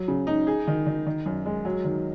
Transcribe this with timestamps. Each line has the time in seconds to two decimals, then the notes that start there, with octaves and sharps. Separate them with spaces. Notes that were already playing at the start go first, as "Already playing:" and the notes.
Already playing: F#3
0.08 C#3
0.27 D#4
0.47 G#4
0.67 D#3
0.86 D#3
1.06 D#3
1.26 F#2
1.46 G#3
1.65 F#3
1.85 D#3